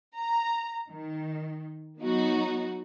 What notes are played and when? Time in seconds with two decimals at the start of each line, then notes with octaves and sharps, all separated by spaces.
0.16 A#5
0.91 D#3
1.99 F#3 B3 D#4 F#4